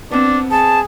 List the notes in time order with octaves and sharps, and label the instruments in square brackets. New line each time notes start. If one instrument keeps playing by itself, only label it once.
[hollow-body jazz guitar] B3 C4 [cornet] D4
[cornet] G#4 [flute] A5